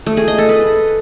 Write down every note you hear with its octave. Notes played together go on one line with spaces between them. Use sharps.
A3
G#4
D#5
A4
B4